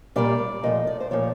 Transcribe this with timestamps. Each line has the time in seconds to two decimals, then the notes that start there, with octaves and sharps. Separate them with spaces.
0.16 A#2 G3 A#3 D5
0.63 A#2 F3 A3 D#5
0.87 D5
1.00 C5
1.11 A#2 F3 A3 C#5